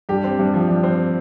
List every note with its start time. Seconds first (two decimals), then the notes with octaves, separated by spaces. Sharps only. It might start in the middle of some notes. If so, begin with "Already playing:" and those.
0.09 G2 G4
0.24 C4
0.39 G2
0.54 F3
0.68 G2
0.83 C4